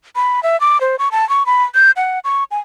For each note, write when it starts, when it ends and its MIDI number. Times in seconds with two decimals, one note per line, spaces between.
0.16 0.43 83
0.43 0.59 76
0.61 0.80 86
0.81 0.96 72
0.99 1.09 85
1.12 1.28 81
1.29 1.46 85
1.46 1.64 83
1.75 1.91 91
1.97 2.19 78
2.24 2.44 85
2.51 2.59 80